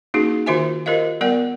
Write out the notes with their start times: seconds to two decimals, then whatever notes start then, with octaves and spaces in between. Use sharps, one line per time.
0.14 A#3 C#4 D#4 E4 F#4 G#4
0.46 D#3 F4 F#4 C5 E5 G#5
0.86 F4 G4 A#4 C5 D#5 F5
1.21 G3 B3 A#4 D5 F#5